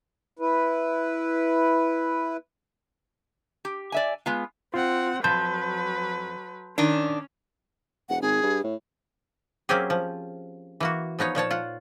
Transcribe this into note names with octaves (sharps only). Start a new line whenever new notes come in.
E4 B4
G4
D5 E5 G#5
G#3 B3 F4
C4 F4 F#5
F2 F#3 B4 A5 C6 G6
D#3 C#4 D4
E1 F#5
G#1 G#4
G2
A2
F#3 A#3 C4 C#4 G4 G#4
F3
E3 A#3 F#4
F3 B3 D#4 C#5
A#2 F3 C#5 A5
F4 F#5